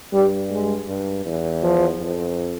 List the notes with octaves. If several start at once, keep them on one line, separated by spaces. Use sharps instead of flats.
G2 G3
G#3
G2
E2
F3
F2